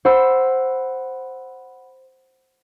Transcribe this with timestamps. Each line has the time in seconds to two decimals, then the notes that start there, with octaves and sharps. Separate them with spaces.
0.05 C5 F#5 B5 E6